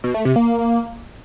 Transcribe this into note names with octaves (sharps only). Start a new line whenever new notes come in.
B2
A3
C3
A#3